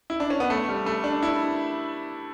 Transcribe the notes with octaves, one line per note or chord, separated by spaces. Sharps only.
E4
D4
C#4
B3
A3
G3
A3
D4
E4